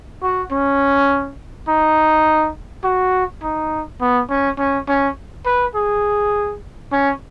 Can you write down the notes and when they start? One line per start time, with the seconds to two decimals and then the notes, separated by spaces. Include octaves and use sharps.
0.23 F#4
0.52 C#4
1.68 D#4
2.84 F#4
3.43 D#4
4.01 B3
4.30 C#4
4.59 C#4
4.89 C#4
5.46 B4
5.75 G#4
6.92 C#4